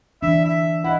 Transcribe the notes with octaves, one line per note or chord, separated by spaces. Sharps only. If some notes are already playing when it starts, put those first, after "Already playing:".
E3 D4 E5
E5
E4 D#5 F#5